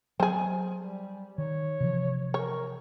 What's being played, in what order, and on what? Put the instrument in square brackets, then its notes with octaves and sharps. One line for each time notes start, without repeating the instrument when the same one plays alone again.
[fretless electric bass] F#3 [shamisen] C4 G#4
[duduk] G3
[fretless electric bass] D#3 [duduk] C#5
[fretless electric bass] C3 E3 F3
[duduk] A#4 [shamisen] C#5